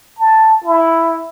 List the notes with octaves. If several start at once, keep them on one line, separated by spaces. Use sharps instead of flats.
A5
E4